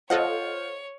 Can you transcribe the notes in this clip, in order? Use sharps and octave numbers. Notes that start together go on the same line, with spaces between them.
F4 A4 C5 C#5 D#5 F#5